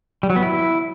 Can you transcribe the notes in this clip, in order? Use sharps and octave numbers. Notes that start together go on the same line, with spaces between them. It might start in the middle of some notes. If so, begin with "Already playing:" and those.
G3
F#3
B3
E4